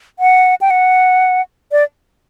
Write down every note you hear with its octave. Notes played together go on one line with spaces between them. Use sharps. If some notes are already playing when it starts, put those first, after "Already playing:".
F#5
G5
F#5
D5